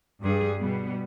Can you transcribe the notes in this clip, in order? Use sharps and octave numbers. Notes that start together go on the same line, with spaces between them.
G2 G3 G#4
B2 G3 B3